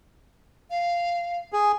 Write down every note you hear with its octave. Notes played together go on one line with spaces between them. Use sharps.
F5
G#4